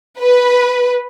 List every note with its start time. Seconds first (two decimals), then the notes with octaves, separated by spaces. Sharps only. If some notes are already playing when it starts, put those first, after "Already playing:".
0.20 B4